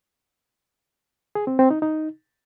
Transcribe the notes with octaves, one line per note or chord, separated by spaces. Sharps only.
G#4
C4
C4
D#4
D#4